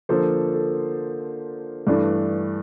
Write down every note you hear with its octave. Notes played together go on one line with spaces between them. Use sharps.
D3 F3 A#3 A4 C5
A4
G2 E3 A3 D4